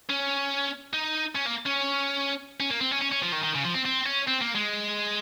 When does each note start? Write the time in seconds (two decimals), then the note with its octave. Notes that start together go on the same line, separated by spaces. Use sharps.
0.09 C#4
0.93 D#4
1.35 C#4
1.46 A#3
1.66 C#4
2.60 C#4
2.71 A#3
2.81 C4
2.92 C#4
3.02 C#4
3.12 C#4
3.23 F3
3.32 D#3
3.43 D#3
3.54 C#3
3.64 F3
3.74 C4
3.85 C4
4.06 C#4
4.27 C4
4.41 A#3
4.55 G#3